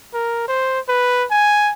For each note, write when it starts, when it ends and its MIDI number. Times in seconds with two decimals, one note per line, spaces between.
0.14 0.47 70
0.48 0.80 72
0.88 1.25 71
1.31 1.73 80